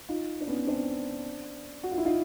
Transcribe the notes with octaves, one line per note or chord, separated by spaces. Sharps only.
D#4 F4
D4
B3 C#4
C4 D4
F#4
F4
E4
D#4 F4